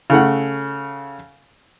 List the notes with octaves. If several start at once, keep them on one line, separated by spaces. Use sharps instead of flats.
C#3 A3 F#5